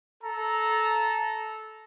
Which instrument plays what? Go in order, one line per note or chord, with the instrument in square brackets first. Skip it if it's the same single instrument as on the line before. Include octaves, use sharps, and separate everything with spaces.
[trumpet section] A4 A#5